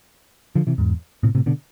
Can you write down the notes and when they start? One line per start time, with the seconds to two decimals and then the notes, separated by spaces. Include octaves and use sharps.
0.55 D3 F3
0.67 C3 E3
0.78 E2 G#2
1.23 A2 C3
1.35 A2 C3
1.46 B2 D3